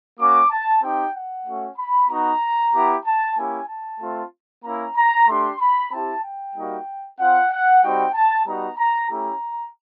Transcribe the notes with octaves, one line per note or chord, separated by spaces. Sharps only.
A#3 C#4 F#4 D6
A5
C4 D#4 G4 G5
F#5
A3 C#4 F#4
B5
B3 D#4 F#4 A#5
B3 E4 G4
A5
A#3 C#4 E4 G4 G#5
A5
A3 C4 F4
A#3 C#4 E4 A#5
A#5
A3 D4 G4 C6
B5
C4 E4 G4 A5
G5
G3 A#3 D#4 F#4
C4 F4 F#5
F#5
G3 C4 D#4 F#4 G5
A5
G3 B3 D#4 F#4 A#5
A#5
A3 C#4 E4 G4 A#5